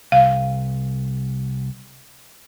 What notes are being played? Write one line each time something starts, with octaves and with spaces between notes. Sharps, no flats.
C2 F5